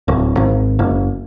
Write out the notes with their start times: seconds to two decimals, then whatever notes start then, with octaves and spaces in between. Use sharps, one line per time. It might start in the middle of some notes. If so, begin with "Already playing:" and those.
0.08 D1
0.37 G#1
0.79 F#1